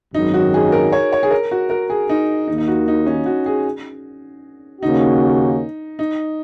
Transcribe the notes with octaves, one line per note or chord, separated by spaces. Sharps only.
G#1 F#2 D#3 F#3 D#4
F#4
G#4
A#4
C#5
C#5
G#4
A#4
F#4
A#4
G#4
D#4
D#2 D#3 A#3 D#4
D#4
F#4
D#4
C#4
F#4
G#4
D#2 C#3 A#3 C#4 D#4 F#4
D#4